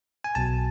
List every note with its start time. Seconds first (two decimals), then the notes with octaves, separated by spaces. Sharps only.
0.24 G#5
0.35 B1 B2 A5